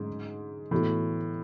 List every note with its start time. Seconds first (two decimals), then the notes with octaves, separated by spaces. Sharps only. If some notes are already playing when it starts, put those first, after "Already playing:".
Already playing: G#2 D3 F#3 C#4
0.71 A2 E3 B3 F#4